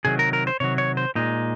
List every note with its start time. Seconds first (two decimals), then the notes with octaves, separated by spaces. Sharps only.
0.05 C3 D#3 F#3 G#4
0.19 A#4
0.33 A#4
0.47 C5
0.60 C3 D#3 F#3 C#5
0.78 C#5
0.97 C5
1.15 A#2 G#3 D#4